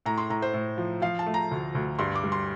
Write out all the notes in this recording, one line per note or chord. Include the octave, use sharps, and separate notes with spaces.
A2 A#5
C6
A2 A#5
C5
A2
F3
F3 F5
A5
A3
A#5
D2
D2
G2 C6
D6
G3
C6